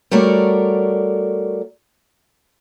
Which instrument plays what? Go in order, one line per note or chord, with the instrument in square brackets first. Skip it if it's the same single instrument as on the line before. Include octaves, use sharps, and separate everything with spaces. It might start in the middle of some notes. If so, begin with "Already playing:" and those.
[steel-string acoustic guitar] G3 A3 F#4 A#4 C#5 D5